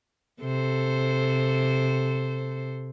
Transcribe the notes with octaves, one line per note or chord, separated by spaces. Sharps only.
C3 A4 C5